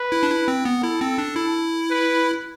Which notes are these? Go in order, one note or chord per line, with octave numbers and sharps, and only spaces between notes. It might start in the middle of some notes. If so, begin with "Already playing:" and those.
Already playing: B4
E4
D4
E4
C4
B3
E4 A4
C4
D4
E4
B4